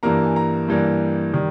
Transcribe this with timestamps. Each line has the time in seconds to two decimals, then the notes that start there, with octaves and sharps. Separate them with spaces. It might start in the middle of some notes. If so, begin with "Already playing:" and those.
0.03 G2 E3 G3 A#3 A#5
0.24 G#5
0.36 A#5
0.68 G2 E3 G3 A#3
1.33 D#3 G3